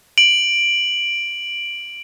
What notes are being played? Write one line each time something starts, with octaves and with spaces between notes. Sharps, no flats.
D7 F#7